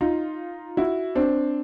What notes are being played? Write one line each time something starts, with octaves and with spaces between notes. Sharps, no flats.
D#4 F4
E4 F#4
C4 D4